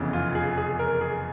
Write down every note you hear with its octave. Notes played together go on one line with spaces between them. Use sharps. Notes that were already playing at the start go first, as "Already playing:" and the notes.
Already playing: F1 E2 C#3 E3
F4
G#4
G#4
A#4
G#4